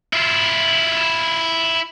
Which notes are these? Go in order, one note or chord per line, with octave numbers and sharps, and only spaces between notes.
E4 F4